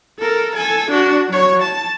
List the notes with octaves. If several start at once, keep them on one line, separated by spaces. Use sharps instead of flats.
A4 A#4
A4 G#5
D4 F#4
F#3 C#5
A5